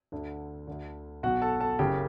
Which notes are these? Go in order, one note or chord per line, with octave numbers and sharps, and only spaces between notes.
D2 D3
D2 D3
B1 B2 F#4 F#5
A4 A5
A4 A5
F#1 F#2 C#3 G4 G5